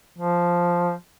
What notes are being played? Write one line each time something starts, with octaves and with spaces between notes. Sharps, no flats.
F3